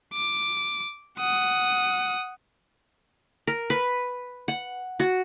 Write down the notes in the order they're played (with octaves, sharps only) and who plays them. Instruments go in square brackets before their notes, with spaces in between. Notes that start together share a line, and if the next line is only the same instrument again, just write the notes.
[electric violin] D6
F#5 D#6
[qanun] A#4
B4
F#5
F#4